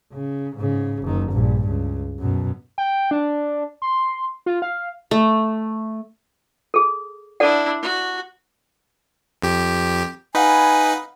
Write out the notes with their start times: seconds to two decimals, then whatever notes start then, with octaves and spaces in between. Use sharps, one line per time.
0.13 C#3
0.56 G#2 C#3
1.03 F#1 D#3
1.31 A#1 G2
1.68 C#2
2.19 F#2 B2
2.78 G5
3.11 D4
3.82 C6
4.46 F4
4.62 F5
5.11 A3
6.74 G#4 A4
7.40 D4 E4 A4 D5 F#5
7.82 F#4
9.42 F2 G4
10.35 D#4 B4 F5 F#5 G#5 B5